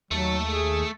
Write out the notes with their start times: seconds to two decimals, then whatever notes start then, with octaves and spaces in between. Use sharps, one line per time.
0.11 D#2 F#3 A3 A4
0.47 G#4